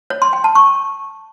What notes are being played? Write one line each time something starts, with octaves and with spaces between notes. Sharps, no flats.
C#5
C6
G5
A5
C#6